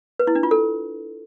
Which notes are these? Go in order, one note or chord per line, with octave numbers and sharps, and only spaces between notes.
B4
E4
D4
F4
A4